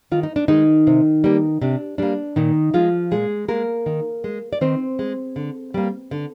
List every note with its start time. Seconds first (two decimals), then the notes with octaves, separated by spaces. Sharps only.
0.12 D#3 F4
0.23 D#4
0.36 D4
0.48 D#3 G#3 D#4
0.87 C3
1.24 G3 A#3
1.62 C3 D4
1.98 G3 A#3 D4
2.36 A#2 D#3 D#4
2.74 F3 G#3 F4
3.11 A#2 G#3 G#4
3.48 G#3 A#3 A#4
3.86 D#3
4.24 G#3
4.53 D5
4.61 D#3 C4 C5
4.99 G#3
5.36 D3
5.74 G3 A#3
6.11 D3